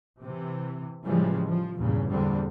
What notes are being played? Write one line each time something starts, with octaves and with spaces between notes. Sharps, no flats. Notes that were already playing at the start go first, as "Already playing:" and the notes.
C3 E3
A2 C#3 E3 F3 G3 G#3
F3
E2 G2 A#2 C#3
E2 A#2 D3 G3 C4